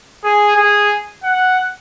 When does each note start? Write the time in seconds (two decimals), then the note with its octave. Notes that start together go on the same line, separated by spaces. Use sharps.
0.24 G#4
0.56 G#4
1.23 F#5